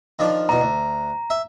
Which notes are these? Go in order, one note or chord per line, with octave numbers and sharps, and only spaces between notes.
D#3 F3 D4
E2 B2 A#5
D2
E5